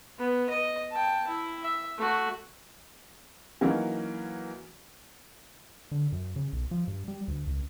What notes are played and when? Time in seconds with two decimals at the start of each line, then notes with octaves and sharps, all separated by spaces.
0.19 B3
0.49 D#5
0.91 G5 A5
1.27 E4
1.63 E5
1.98 A3 F#4
3.61 E3 F#3 A#3 C#4 D#4
5.92 D3
6.12 F#2
6.36 C#3
6.53 B1
6.71 F3
6.87 G2
7.08 G3
7.28 D2
7.47 C#2